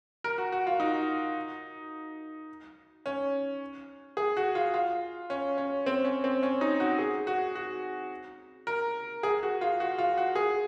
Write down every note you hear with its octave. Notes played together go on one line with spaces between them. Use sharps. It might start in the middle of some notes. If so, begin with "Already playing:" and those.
A#4
F#4
F#4
F4
D#4
C#4
G#4
F#4
F4
F4
C#4
C#4
C4
C#4
C4
C#4
D#4
F#4
G#4
F#4
F#4
A#4
G#4
F#4
F4
F#4
F4
F#4
G#4